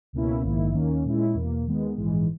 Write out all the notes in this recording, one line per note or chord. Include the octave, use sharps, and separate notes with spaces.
C#2 B2 A#3 C#4 E4
A#1 G#2 D#3 A#3 E4
D#2 D#3 A#3 C#4
A#2 G#3 C#4 E4
E2 B2 A#3
D#2 D#3 G#3 B3
A#1 G#2 E3 G#3